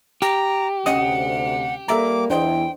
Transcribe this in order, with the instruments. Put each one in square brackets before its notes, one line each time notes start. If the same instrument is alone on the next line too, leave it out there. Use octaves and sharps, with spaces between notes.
[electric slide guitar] G4 [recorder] A#5
[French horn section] D2 C3 [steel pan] C#4 D#5 D#6 [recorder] F#5
[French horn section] G3 A#3 [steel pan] A4 E5 A#5 [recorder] D6
[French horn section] E2 E3 E4 [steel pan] D4 C5 D#5 [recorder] G5